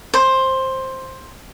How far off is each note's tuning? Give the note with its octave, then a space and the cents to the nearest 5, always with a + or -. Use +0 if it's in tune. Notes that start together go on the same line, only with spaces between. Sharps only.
C5 +10